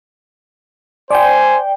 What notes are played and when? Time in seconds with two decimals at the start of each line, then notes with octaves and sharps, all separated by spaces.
1.11 C5 D5 G5 G#5